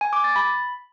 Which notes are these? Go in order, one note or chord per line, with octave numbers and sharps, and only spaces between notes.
G#5
D6
A6
B5